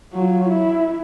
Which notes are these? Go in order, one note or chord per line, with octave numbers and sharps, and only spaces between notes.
F#3 F4
E4